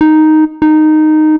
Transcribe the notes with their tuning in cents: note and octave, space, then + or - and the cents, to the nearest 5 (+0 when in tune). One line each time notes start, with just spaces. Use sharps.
D#4 +0
D#4 -10